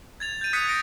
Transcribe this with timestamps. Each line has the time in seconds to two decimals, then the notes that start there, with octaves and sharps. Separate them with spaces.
0.20 G#6 A6 F7
0.41 G6 D#7
0.53 D#6 F#6 G#6 B6 C#7 D#7
0.69 A#6 D7